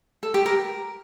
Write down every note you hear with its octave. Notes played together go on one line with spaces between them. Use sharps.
A4
G4
A#4